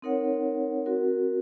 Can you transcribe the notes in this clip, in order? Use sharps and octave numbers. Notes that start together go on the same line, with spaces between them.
C4 D#4 A#4 C#5 F#5
C4 F#4 A#4